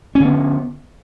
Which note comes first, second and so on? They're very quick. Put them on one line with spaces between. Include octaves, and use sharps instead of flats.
C#4 D3 B3